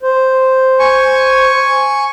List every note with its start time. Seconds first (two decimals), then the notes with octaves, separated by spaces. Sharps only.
0.03 C5
0.79 G#5 C#6